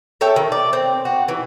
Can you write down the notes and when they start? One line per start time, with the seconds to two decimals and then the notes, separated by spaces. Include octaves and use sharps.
0.21 A4 C#5 E5 G5
0.36 D#3
0.52 D5
0.73 C4
1.05 F#4
1.28 E3